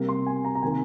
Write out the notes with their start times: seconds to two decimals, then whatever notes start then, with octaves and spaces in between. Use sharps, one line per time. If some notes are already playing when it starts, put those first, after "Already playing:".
Already playing: C3 G3 A#3
0.09 C6
0.27 G#5
0.45 A#5
0.55 A#5
0.63 C3 D#3 A#3 G#5